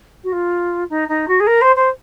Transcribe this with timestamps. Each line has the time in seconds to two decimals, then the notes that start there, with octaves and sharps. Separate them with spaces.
0.24 F#4
0.32 F4
0.90 D#4
1.09 D#4
1.28 F#4
1.40 G#4
1.47 A#4
1.61 C5
1.76 C5